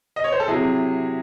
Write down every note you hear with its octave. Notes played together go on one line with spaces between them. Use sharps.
D#5
C#5
C5
A4
C3 F#3 E4 G#4